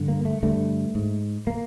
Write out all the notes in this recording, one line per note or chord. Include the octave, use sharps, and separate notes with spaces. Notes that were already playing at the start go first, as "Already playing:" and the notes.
Already playing: G2 D3
A#3
A3
G2 D3 A3
G#2
A#3